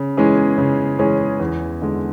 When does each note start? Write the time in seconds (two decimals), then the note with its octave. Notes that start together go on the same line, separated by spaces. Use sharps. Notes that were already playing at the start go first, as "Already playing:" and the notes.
Already playing: C#3
0.17 E3 G#3 C#4 G#4
0.58 C#3
0.99 E3 G#3 C#4 G#4
1.40 E2
1.82 D3 G#3